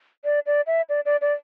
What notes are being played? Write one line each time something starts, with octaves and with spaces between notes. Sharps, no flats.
D5
D5
E5
D5
D5
D5